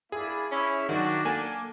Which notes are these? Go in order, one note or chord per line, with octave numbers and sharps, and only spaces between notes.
A#3 D4 E4 G#4
C#4 E4
D#3 F#3 D4 F#4
A#3 A4 G#5